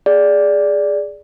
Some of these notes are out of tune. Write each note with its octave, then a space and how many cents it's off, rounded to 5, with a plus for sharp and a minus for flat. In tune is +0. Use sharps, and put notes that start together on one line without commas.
G#4 +0 D5 -5